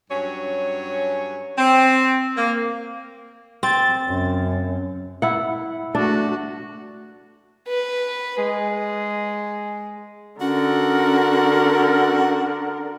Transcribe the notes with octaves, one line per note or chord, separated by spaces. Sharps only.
G2 F#3 C#4 C#5
C4
A#3
C4 A6
F#2 C#3
E4 F#5
A3 D4 F#4
B4
G#3
D3 C#4 F#4 A#4